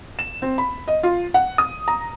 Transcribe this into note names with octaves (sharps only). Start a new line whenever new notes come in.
E7
C4
B5
D#5
F4
F#5
D#6
A#5